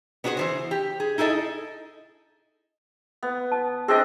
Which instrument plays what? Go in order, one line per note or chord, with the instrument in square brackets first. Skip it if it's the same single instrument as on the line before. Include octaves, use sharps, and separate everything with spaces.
[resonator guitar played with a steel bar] B3 D4 F#4 G#4 C5
E3 F3 C5
G4
G#4
D#4 E4 G#4 A4 D#5
[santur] B3
[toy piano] A5
[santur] C4 D4 D#5 [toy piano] G#4